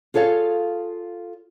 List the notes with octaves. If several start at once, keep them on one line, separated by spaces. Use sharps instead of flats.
F4 G#4 A4 C#5 F5